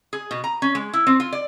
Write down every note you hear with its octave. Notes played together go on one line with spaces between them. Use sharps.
G#4
B2
A#5
C#4
G#3
E4
C4
F4
D5